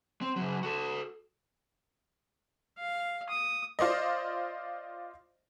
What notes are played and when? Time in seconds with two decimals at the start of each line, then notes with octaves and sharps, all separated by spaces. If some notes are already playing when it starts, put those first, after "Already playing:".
0.21 C4
0.36 C#3 F#3
0.63 F#4 A4
2.78 F5
3.30 D#6
3.79 F4 C5 D5 D#5